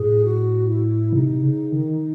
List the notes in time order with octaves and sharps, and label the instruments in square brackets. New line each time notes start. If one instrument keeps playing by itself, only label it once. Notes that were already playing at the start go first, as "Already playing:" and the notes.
Already playing: [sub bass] A2 [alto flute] G#4
[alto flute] F#4
E4
[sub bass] C3 [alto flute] D#4
[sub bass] C#3
D#3